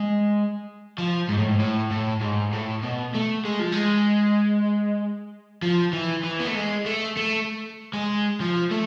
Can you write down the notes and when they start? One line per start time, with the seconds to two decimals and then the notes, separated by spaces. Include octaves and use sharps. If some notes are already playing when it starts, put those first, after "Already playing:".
Already playing: G#3
0.98 F3
1.29 G#2
1.38 A2
1.48 G#2
1.59 A2
1.91 A2
2.21 G#2
2.53 A2
2.83 B2
3.14 A3
3.45 G#3
3.59 F3
3.73 G#3
5.62 F3
5.93 E3
6.24 E3
6.40 B3
6.48 A3
6.55 G#3
6.86 A3
7.17 A3
7.93 G#3
8.41 F3
8.71 A3